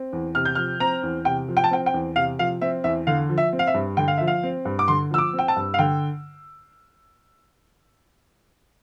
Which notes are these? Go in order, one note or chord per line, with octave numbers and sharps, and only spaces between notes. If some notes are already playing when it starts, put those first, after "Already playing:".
Already playing: C4
E2
C3 F6
G6
F3 F6
C4 A#5
E2
C3 G5
F3
G5
A5
C4 G5
G5
E2
C3 F5
F3 F5
C4 E5
E2 E5
D3 F5
F3
E5
C4
F5
E5
G2
D3 G5
F5
F3 E5
F5
C4
G2
D6
D3 C6
F3 E6
D6
C4
G5
A5
G2
F5
D3 G5